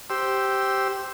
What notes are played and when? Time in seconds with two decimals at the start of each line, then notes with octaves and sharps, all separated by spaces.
0.10 G4 C5 E6